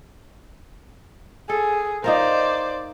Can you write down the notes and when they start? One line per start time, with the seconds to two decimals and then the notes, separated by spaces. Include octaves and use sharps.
1.49 G#4 A4
2.04 D#4 F4 A#4 C5 D5